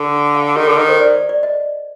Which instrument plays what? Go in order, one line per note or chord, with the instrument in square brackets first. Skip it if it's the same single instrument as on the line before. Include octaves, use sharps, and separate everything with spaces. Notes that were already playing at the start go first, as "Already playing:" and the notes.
Already playing: [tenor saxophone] D3
[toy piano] F5
[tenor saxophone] D#3 [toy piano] G4
[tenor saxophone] D3 [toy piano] A4
[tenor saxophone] D#3 [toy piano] A#4
[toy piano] C5
D5
D5
D5
D#5